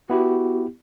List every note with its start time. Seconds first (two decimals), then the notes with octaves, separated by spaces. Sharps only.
0.10 B3 E4 F#4 G4